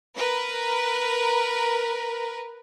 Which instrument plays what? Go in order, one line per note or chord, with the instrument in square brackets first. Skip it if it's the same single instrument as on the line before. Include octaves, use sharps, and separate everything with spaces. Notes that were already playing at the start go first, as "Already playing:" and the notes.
[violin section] A#4 B4